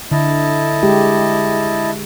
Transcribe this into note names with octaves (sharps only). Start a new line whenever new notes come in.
D3 E4 D#5 A5
G#3 G4